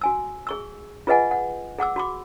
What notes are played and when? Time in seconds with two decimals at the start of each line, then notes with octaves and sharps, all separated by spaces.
0.01 F#4 G#5 E6
0.47 G#4 C#6 E6
1.07 F4 G#4 B4 D#5 F#5 G#5
1.31 F#5
1.79 G#4 F#5 D6 E6
1.96 F#4 B5 D6